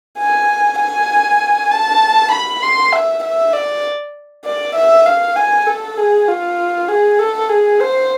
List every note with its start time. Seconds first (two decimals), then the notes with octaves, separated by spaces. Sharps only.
0.19 G#5
0.80 G#5
1.71 A5
2.31 B5
2.62 C6
2.92 E5
3.23 E5
3.53 D5
4.45 D5
4.75 E5
5.06 F5
5.36 G#5
5.67 A4
5.97 G#4
6.28 F4
6.89 G#4
7.19 A4
7.49 G#4
7.79 C5